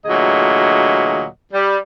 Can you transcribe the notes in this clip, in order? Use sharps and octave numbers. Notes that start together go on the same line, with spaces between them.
D2 A#2 E3 F#3 G#4 D#5
G3